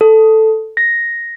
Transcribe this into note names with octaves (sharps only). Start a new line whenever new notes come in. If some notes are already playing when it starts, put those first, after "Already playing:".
A4
A#6